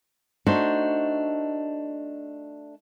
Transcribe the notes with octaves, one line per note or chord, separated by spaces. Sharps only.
A3 D4 D#4 F#4 C5